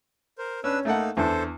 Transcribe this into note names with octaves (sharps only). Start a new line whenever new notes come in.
A#4 C5
C#4 D4 B4 E6
A3 A#3 D#4 A4 F#5
E2 D4 A4 C5